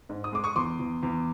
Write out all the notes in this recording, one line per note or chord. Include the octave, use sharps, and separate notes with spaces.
G#2
D#6
G#3 D6
C#6 D#6
E2 C6 D6
E2
E2